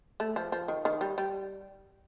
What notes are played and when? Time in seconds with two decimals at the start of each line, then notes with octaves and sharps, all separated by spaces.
0.20 A3
0.36 F3
0.52 F3
0.68 D#3
0.85 D#3
1.01 G3
1.18 G3